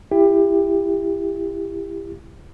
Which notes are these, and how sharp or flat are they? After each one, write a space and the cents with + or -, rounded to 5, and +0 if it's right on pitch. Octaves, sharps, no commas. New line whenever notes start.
E4 +25 G4 +25